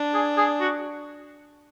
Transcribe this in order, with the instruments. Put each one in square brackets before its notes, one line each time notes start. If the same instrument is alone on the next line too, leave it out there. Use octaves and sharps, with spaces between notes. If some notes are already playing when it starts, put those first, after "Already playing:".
Already playing: [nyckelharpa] D4
[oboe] G#4
G#4
F#4